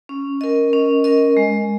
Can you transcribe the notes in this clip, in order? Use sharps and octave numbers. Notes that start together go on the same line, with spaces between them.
C#4
A#4 D#5
C#4
A#4 D#5
G#3